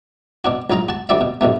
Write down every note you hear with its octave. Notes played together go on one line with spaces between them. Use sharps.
B2 D4 F#4
A#1 F#3 D#4 F4 A#5
F#4 A5
D2 G3 F#4 D5 E5
B2
A#1 G2 B2 A3